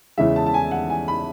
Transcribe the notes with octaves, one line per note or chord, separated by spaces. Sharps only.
E2 C#3 E3 G#3 E5
A5
A5
G#5
F#5
G#5
B5